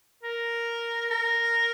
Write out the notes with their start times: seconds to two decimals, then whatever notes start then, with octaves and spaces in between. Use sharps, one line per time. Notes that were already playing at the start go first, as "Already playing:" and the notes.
0.23 A#4
1.11 A#4